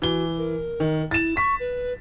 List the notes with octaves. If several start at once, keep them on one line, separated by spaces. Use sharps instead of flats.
E3 F#4 G7
A#4
D#3
E4 A6 E7
C#6 B6
B4